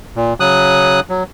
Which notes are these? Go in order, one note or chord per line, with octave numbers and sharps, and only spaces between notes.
A#2
C#3 F#3 D#6 F#6
F#3